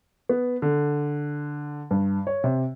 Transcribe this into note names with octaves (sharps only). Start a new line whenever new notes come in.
B3
D3
G2
C#5
C3